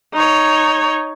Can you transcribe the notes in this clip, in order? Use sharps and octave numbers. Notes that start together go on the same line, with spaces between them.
D#4 C#5